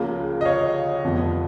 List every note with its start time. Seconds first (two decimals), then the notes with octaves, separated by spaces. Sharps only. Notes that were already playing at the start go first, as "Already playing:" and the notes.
Already playing: C#2 C#3 F3 A#3
0.41 D#5
0.45 C#5 F5
1.04 F1 F2 F3 B3